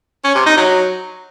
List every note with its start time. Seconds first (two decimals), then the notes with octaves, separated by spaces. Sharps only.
0.24 C#4
0.35 C3
0.46 D#4
0.57 F#3